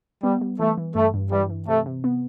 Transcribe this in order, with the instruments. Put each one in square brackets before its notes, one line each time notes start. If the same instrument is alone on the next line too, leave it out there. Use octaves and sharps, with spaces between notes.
[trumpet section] G3 [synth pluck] B3
[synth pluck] G3
[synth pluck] E3 [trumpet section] A3
[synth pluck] E3
[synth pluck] G2 [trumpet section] A3
[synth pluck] G2
[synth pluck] E3 [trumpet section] G3
[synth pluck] E3
[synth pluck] C3 [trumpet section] A3
[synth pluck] C3
B3